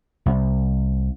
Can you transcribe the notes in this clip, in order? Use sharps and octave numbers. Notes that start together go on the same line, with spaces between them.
C2